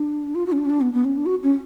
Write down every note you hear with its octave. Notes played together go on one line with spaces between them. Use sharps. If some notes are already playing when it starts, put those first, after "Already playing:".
Already playing: D4
F4
F#4
C#4
D4
C#4
D4
B3
B3
C#4
D4
F#4
C#4